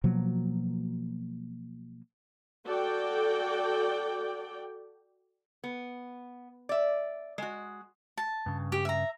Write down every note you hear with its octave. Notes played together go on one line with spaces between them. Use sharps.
B2 F3 F#3 A#3
F#4 A4 D5 G5
B3
D5 E5
G#3 F#4
A5
G2 C#3
G4
E5 A#5